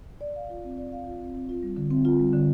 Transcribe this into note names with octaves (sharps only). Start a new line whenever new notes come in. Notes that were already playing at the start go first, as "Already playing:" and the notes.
D5
F5
F4
C4
D5
F5
F4
C4
C4
F4
G3
D3
C4
F4
G3
D3